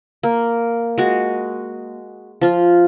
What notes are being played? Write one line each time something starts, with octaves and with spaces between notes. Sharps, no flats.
A#3
G#3 F#4
F3 F4